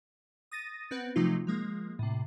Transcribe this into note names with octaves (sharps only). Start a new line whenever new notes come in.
D#6 A6 A#6 D#7
B3 C4 B4 F#5
C3 F3 F#3 A3 D#4 F4
F3 G#3 A#3
A2 C3